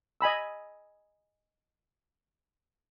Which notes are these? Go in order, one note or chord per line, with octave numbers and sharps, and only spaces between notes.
D#5 G#5 B5 E6